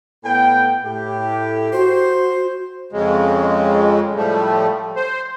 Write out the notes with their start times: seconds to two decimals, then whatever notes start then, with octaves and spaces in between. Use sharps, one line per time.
0.24 A2 B3 G5
0.84 A2 G4
1.73 F#4 C5
2.92 F2 C#3 G#3
4.15 A2 F3 G3 A3
4.96 C5